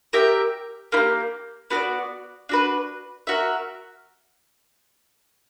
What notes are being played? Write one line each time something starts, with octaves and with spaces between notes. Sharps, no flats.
G4 A#4 E5 G5
A#3 E4 G4
B3 F#4 A#4 D5
D4 F#4 B4
F#4 A#4 E5